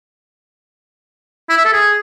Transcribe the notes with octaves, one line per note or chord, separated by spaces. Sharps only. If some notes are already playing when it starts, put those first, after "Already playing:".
E4
E5
A4
G#4